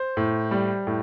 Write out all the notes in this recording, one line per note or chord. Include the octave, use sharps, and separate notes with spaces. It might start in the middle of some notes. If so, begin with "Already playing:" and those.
Already playing: C5
A2
G3
A2